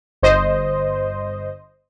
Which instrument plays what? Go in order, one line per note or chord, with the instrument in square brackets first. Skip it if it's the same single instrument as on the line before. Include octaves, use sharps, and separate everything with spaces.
[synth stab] G1 C5 D#5